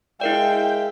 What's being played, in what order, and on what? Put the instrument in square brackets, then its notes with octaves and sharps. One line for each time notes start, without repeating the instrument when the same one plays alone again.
[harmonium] G#3 E5 F5 [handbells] E4 A#4 D5 [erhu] G5